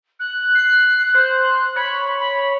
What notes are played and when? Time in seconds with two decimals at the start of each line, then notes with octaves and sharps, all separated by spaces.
0.20 F#6
0.55 C7
1.14 C5
1.76 C#5 B5
2.19 B5